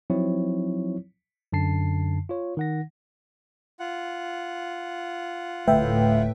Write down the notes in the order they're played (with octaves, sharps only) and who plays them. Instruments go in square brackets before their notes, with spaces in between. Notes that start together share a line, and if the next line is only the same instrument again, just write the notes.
[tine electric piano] F3 F#3 C4 D#4 E4 C#5
F#2 D3 A5 C7
F4 C#5
D#3 F#5 A#6
[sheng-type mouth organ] F4 F#5
[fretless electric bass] D1 D3 A3 [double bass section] A2 [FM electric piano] B4 E5 G5